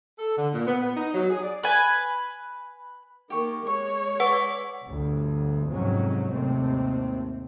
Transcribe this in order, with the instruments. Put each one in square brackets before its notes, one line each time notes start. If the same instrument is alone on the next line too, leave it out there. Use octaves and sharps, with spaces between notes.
[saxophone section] A4
D3
A#2
B3
B3
D#4
F#3
G#4
D5
[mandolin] B4 G#5
[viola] D#3 A#3 [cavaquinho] G4 C#6
[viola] G#3 C#5 [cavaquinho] C#6
[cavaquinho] G#4 D5 C#6 [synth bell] B4 F#5
[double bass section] G1 D2
F2 G#2 C3 F#3 C#4
D#2 G#2 C3 A3 C4